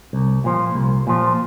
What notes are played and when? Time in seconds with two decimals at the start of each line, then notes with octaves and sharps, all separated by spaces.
0.13 C2
0.44 A#2 F3
0.75 C2
1.07 A#2 F3